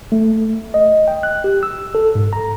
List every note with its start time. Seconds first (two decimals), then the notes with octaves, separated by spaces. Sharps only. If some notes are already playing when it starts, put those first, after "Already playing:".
0.12 A3
0.74 D#5
1.08 G5
1.23 F#6
1.44 G4
1.63 E6
1.95 A4
2.15 G#2
2.33 A#5